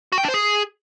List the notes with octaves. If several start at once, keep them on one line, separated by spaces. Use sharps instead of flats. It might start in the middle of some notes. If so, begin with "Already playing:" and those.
F#4
G5
D4
C5
G#4